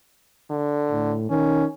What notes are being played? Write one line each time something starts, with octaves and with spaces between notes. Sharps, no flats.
D3
A2
D#3 C#4